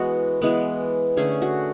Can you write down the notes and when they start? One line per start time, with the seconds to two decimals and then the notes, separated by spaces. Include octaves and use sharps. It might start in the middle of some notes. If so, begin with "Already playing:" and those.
Already playing: E3 G#3 B3 F#4
0.42 E3 G#3 B3
1.17 D3 A3 C#4 G#4
1.42 F#4